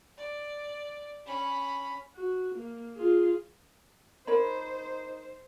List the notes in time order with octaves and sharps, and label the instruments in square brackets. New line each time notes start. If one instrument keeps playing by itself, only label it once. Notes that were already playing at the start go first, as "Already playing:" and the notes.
[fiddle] D5
C#4 B5
[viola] F#4
A#3
F4 G#4
[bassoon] D#4 [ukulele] A#4 C#5 B5 [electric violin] C5